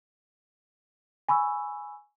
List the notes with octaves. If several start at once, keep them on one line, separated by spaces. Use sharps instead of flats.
G#5 B5 C#6 E6